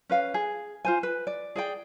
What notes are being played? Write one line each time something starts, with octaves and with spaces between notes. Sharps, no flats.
C#4 B4 F5
G#4
F4 C5 G#5
B4
D5
G#4 D5 G5